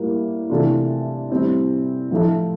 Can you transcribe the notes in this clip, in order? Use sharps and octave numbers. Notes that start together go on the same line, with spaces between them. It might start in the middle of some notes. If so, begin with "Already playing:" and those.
Already playing: A2 G3 A#3
C3 E3 A3 D4 F4
A2 G3 C4 E4
A2 F3 A3 E4